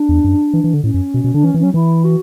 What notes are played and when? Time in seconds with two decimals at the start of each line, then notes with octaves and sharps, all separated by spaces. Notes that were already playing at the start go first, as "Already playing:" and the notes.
Already playing: D4
0.09 E2
0.24 F#2
0.53 E3
0.64 E3
0.74 D3
0.84 A2 C#4
0.94 F#2
1.14 B2
1.24 B2
1.34 D3 D4
1.44 E3 C#4
1.54 E3
1.59 F#3 C#4
1.74 E3 E4
2.04 F#4